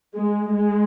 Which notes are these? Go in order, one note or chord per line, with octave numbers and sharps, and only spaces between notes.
G#3
G#3